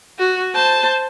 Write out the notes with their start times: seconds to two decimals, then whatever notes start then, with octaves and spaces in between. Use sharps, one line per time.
0.19 F#4
0.55 C5 A5